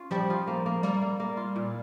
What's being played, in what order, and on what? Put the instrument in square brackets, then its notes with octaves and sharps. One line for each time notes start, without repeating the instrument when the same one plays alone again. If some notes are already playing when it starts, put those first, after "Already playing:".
Already playing: [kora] C#4 F4
[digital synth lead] F3 [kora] G3
[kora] F4
A#3
A#3
[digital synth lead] G3 [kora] A#3
[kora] A#3
A#3
F4
A#2